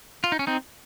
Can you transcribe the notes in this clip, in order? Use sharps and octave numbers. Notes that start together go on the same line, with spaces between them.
F4
D#4
C#4
C4 D#4